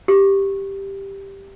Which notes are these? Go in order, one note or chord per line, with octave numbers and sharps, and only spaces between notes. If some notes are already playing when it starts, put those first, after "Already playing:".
G4